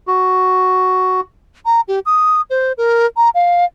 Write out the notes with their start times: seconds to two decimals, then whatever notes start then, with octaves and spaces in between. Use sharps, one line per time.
0.07 F#4
1.66 A#5
1.88 G4
2.05 D#6
2.50 C5
2.77 A#4
3.17 A#5
3.35 F5